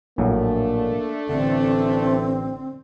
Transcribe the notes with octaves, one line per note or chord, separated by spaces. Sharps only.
A#1 A2 F#3 A3 A#3 D4
A1 D3 C4